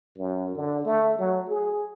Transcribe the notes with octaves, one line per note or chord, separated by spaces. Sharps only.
F#2
D3
A3
F#3
G#4